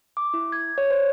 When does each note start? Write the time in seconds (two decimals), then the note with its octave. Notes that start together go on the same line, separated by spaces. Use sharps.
0.17 D6
0.34 E4
0.52 G#6
0.78 C#5
0.90 C5